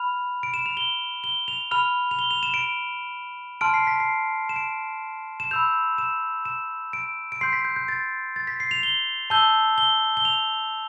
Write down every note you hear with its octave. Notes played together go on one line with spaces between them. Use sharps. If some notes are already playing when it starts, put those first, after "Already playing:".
Already playing: B5 F6 F7
D7
E7
F7
G7
G7
F7
B5 F6 F7
F7
G7
F7
E7
D7
A5 C6 F6 D7
C7
B6
C7
E7
D7
E7
B5 E6 G6 F7
E7
E7
D7
D7
C6 G6 C7
B6
G6
G6
A6
A6
B6
C7
F7
G7
A5 E6 G6 G7
G7
G7
F7